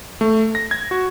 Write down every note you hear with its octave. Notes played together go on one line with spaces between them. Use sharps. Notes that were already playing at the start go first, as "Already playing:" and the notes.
A3
A#6
G#6
F#4